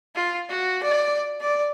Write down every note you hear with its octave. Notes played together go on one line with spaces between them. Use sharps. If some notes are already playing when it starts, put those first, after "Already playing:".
F4
F#4
D5
D5